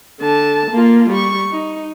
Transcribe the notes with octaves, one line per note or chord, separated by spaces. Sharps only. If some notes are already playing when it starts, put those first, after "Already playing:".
D3 A5
A#3 F4
G3 C#6
D#4